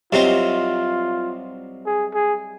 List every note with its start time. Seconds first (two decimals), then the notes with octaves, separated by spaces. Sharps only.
0.12 C2 C3 F#3 C4 D#4 F4
1.86 G#4
2.14 G#4